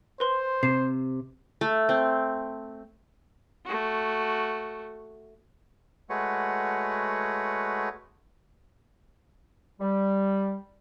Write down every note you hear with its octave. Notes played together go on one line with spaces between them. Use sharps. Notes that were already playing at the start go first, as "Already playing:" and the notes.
B4 C5 C6
C3 C7 E7
A3
C4
A3 F#4
G#3 A3 F#4 B4 C#5 F#5
G3